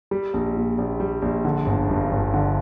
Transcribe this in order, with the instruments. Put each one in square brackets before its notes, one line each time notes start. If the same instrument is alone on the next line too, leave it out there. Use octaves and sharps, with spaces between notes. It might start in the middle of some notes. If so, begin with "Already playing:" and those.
[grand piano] G3
A#1
A#2
A#1
G3
A#1
D3
G1
G2
G1
D3